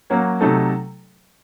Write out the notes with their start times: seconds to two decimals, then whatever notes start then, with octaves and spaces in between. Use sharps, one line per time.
0.10 F#3 A#3 C#4 F#4
0.40 C3 F#3 A3 D#4 A4